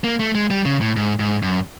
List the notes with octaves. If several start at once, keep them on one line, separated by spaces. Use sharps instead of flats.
A#3
A3
G#3
G3
C#3
A2
G#2
G#2
F#2